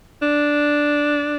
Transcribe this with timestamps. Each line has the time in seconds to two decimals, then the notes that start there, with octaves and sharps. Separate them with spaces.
0.22 D4